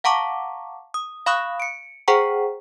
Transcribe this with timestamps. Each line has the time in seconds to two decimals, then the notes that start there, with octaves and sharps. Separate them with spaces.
0.04 F5 F#5 A5 A#5 C#6 D6
0.94 D#6
1.26 F5 B5 C#6 D#6 F#6
1.60 C#7 D7
2.08 G#4 C5 F#5 G5 A#5 C#6